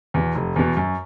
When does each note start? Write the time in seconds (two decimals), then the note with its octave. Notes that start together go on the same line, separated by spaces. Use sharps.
0.14 E2 B2
0.35 F1
0.56 E2 B2
0.77 F#2